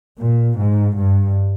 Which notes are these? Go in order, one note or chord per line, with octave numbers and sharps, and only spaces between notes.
A#2
G#2
G2